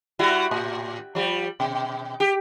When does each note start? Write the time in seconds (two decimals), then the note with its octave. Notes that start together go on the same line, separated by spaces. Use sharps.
0.19 G3 E4 F#4
0.51 A2
1.15 F3 G3
1.60 B2
2.20 G4